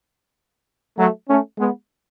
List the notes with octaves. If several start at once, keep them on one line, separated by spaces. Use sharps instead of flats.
F#3 A3
A3 C#4
G#3 B3